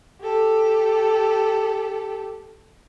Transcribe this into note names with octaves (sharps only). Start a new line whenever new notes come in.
G4 A4